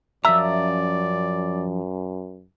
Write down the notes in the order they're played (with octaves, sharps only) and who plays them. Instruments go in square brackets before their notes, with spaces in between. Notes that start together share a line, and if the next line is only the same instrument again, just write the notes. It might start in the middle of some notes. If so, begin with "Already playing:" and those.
[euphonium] F#2 [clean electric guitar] F3 C#4 A#5 [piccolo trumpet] D5 [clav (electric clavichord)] E5